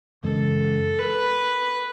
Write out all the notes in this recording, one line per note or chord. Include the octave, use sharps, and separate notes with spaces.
F#2 C#3 E3 G#3 A4
B4